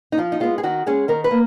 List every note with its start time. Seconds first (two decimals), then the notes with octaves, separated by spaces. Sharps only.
0.12 D#4
0.18 F3 F4
0.32 D#4
0.40 G#3 B3 F4
0.58 G#4
0.63 D#3 F#4
0.86 G#3 C#4 G#4
1.08 D#3 A#4
1.24 B4
1.31 A#3